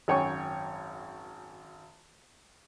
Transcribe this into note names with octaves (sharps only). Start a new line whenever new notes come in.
G#1 F#2 C#5 G5 G#5 C#6